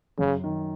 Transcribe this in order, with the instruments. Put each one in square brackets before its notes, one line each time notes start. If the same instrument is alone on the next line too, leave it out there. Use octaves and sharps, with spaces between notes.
[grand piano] F#2 [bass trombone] C#3
[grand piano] D#3